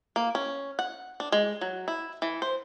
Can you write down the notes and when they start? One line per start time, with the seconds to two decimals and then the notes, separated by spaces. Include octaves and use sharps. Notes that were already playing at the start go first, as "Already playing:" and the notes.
0.16 A#3
0.35 C#4
0.79 F#5
1.20 D4
1.32 G#3
1.61 F#3
1.88 E4
2.22 E3
2.42 C5